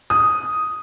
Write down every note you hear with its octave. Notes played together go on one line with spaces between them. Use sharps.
D#6